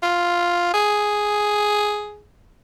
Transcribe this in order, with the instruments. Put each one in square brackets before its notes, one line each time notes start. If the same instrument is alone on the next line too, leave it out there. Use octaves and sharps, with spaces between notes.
[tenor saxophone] F4
G#4